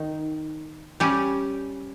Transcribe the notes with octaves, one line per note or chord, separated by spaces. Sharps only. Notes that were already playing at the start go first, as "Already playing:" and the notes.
Already playing: D#3 D#4
G3 C#4 G4